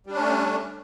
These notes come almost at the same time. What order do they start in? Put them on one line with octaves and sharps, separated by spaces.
G3 D4 C#4 A3